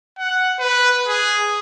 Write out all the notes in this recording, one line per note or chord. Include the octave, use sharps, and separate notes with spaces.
F#5
B4
G#4